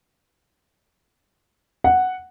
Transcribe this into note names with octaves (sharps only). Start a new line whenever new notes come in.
F#5